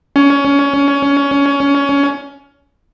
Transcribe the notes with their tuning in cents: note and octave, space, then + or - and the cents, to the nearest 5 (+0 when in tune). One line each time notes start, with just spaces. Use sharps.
C#4 +20